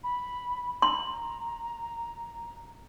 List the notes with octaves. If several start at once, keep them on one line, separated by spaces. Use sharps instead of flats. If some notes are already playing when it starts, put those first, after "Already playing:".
B5
A#5 C6